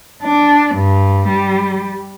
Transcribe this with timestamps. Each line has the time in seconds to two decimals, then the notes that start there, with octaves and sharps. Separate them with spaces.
0.23 D4
0.75 G2
1.28 G3